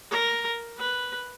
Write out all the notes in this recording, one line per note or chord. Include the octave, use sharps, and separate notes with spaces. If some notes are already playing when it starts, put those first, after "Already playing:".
A#4
B4